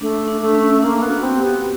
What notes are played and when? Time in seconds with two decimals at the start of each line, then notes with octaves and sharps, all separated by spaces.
0.01 A3 D4
0.28 D4
0.41 A3
0.55 C#4
0.82 A#3 D4
1.02 B3
1.09 F#4
1.23 C4
1.36 G4
1.43 B3